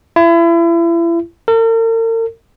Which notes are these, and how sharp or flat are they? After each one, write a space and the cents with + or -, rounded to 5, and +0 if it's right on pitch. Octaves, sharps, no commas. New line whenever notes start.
E4 +35
A#4 -45